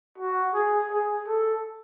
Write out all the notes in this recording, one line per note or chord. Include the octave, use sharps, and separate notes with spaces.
F#4
G#4
G#4
A4